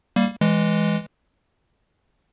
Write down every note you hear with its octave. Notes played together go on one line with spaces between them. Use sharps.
G3 A#3
E3 G#3